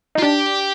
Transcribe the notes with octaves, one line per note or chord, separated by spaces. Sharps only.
D#4
F4
D4 G4